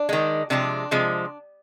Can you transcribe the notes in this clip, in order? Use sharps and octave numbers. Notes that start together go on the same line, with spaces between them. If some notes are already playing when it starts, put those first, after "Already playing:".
Already playing: D4
D#3 G#3
C3 F3 G#3 D4
C3 F3 G#3